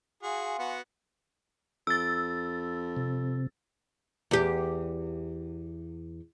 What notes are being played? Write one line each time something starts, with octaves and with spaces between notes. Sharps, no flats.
F#4 G#4 F5 G#5 C6
B3 F#4
F2 E6 A6
C3
E2 G4